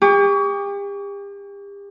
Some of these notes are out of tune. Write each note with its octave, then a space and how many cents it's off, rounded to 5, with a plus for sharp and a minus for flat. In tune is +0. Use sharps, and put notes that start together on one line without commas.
G4 +40 C#6 +35